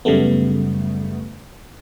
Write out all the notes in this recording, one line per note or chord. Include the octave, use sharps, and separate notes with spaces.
F#2 C#3 G3 A3 B3